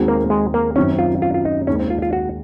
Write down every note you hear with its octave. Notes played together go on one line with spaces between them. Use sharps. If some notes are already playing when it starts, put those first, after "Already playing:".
Already playing: D#2 D#3 G#3 C4 F#4
A#3
G#3
A#3
F#2 D#3 F#3 C4 C#4
F4
F4
F4
D#4
D#2 D#3 G#3 C#4
C4
F4
F4
F#4